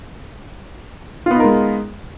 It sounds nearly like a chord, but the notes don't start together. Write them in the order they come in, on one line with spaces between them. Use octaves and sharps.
F4 B3 D#4 A#4 G#3